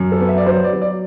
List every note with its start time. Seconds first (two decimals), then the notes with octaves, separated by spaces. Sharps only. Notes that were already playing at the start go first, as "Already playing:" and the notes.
Already playing: F#2
0.12 A4
0.20 B3
0.29 E5
0.38 D5
0.46 F#3 C5
0.64 D5
0.73 F#3
0.82 D5